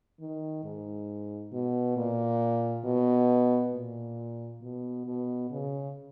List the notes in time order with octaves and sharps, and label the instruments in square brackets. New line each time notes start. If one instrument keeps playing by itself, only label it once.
[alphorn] D#3
G#2
B2
A#2
B2
A#2
B2
B2
C#3